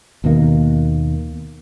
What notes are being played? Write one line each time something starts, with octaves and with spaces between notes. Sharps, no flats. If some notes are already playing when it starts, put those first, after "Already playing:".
D#2 B2 D#3 A#3